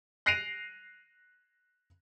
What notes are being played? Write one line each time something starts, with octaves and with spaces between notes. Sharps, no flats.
F#6 A#6 C7 D7 D#7 F7